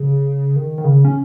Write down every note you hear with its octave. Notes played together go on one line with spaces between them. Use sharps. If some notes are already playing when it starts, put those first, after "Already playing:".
Already playing: C#3
D#3
D#3
C#3
C#4